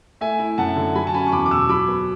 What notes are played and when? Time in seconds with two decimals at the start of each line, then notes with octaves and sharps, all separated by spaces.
0.21 A3 E5 G#5
0.39 E4
0.58 F#2 F#5 A5
0.76 D3
0.95 F#3 G#5 B5
1.07 A5
1.14 C#4 G#5 B5
1.27 C#6
1.32 E2 B5 D6
1.46 D6
1.51 B2 C#6 E6
1.69 F#3 B5 D6
1.88 B3